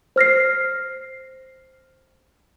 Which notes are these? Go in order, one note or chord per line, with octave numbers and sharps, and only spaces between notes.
C5 F6 A#6 C7